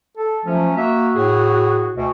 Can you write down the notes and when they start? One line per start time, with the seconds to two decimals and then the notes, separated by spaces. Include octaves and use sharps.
0.17 A4
0.46 F3 F#3 A3 C#4
0.76 A#3 F#4 E5
1.15 A2 G#4
1.96 D2 B2